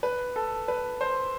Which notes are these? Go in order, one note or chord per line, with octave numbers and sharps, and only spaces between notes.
B4
A4
B4
C5